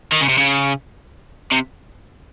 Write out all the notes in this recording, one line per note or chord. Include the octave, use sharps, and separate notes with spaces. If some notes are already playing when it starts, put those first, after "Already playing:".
D#3
C#3
C3
C#3
C3